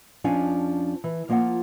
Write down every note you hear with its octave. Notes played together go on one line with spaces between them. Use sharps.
F2 F3 C#4 D4 F5 G#5
E3
F3 A#3 F4 F5 F#5